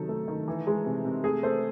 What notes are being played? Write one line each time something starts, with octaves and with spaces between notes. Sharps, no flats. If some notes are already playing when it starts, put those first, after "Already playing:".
Already playing: C3 D#3 F#3 A4
A3
D#3
E3
G#3
C3
C3
A3 G#4
A3 C5